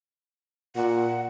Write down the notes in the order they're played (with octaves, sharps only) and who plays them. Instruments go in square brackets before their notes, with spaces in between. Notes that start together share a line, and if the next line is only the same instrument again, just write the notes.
[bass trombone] A#2 [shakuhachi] F#5